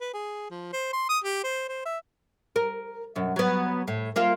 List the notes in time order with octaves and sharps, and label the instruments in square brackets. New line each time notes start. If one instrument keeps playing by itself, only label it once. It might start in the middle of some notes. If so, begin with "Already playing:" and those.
[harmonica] B4
G#4
F3
C5
C6
D#6
G4
C5
C5
E5
[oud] A#4
F#2 B2
F#3 B3
A2
A#3 F4 E5